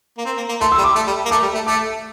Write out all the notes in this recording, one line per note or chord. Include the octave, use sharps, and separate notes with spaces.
A#3
C4
A#3
A#3
A3 C6
E6
G3
D6
A3
G3
A#3
A3 D6
G3
A3
A3 D6